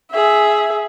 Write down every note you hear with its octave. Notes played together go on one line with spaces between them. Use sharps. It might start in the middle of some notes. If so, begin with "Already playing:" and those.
G#4 E5